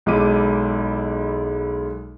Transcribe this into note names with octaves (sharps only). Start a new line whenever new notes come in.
B1 G#3 E4 D6 D#7